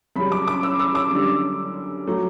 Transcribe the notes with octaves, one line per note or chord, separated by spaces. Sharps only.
F#2 C#3 G3 B5
D6
D6
E6
E6
D6
F#2 D3 G3
F#3 A3